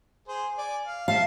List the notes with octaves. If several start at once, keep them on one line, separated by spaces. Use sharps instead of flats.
G#4 C5
D5 G#5
F5
E5 F5 A5